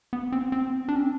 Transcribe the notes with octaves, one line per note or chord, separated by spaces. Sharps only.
B3
C4
C4
D4
C#4
C4